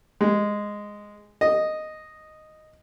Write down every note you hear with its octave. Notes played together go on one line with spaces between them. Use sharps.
G#3
D#5